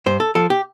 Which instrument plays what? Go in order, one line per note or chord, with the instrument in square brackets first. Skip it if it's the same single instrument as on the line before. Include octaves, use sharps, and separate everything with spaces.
[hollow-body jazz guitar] G2 C5
A4
F3 A4
G4